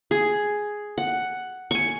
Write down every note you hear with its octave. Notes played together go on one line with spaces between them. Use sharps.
G#4
F#5
G#5 C#6